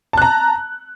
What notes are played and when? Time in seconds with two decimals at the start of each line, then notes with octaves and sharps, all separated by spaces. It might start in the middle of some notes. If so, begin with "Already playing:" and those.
0.13 A5
0.18 F#6
0.22 A#5